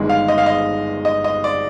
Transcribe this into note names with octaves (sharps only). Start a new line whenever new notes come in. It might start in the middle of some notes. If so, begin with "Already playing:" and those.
Already playing: G1 G2 D#3 G#3
F5
D#5
F5
D#5
D#5
D#5
D5